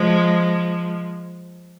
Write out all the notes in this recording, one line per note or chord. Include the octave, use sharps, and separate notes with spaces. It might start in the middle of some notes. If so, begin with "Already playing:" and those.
Already playing: F3 G#3